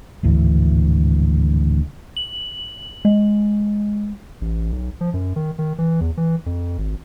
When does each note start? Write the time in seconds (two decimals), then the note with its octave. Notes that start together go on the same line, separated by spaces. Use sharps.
0.23 D1 G#1 D2 E3
2.17 F#7
3.05 G#3
4.41 A1
4.72 B1
5.01 F3
5.14 F#2
5.36 D#3
5.58 D#3
5.78 E3
6.01 E2
6.17 E3
6.46 F2
6.79 G#1